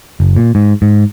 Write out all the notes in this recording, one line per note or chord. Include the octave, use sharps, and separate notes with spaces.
F#1
A#2
G#2
G#2